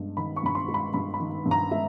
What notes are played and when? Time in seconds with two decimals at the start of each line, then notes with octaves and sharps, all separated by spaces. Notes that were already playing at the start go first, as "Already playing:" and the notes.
Already playing: G2 G#3
0.17 D#3 B5
0.36 C#6
0.43 G2 B5
0.55 C6
0.68 G#3
0.74 B5
0.94 G2 B5
1.14 B5
1.20 D#3
1.46 G2
1.51 A#5
1.71 G#3 E5